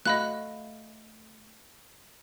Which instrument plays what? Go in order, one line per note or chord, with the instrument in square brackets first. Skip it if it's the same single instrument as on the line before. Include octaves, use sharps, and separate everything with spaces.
[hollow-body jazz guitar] A3 F#4 F5 [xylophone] D#5 B5 F#6